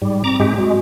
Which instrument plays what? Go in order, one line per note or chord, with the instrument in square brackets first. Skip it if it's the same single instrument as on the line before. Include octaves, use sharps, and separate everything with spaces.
[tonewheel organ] G#2 G3
[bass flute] C4 [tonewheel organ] A#5 D6
[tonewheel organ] G#2 G#3 G4
[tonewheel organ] G#3 [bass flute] F#4